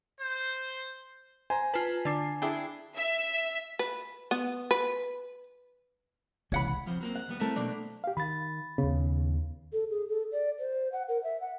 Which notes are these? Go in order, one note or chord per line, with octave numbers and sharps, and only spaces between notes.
C5
C5 G#5 A#5
F4 B4 A5
D3 D4 C7
D4 E4 G#4 G5
E5
B4
B3
B4
C2 C#3 E3 G#3 C#5 F#5 B5
F2 F3 C4
F#3 A#3 C4
F#5
D#2 G3 B3
A3 C4 E4 A#4 B6
B2 F#3 A#3 D4
G4 F5
D#3 B5 A6
D#2 C#3 B3
A4
G#4
A4
D5
C5
F#5
A#4
E5
F#5